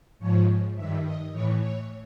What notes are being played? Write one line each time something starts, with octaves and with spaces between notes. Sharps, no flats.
G#2 F3 C#5
G2 D#3 E5
D#5
A2 E3 C#5
C#5